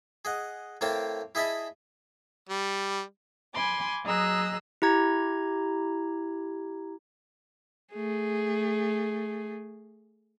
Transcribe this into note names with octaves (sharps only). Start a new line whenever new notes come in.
G#4 D#5 F#5
A2 A#3 C4 C#5 G5 A5
E4 G#4 D#5 E5 A5 B5
G3
G#5 B5 C6 D6
F#3 G#4 D#5 A#5 E6 F#6
E4 G4 A#5 G#6
A3 G#4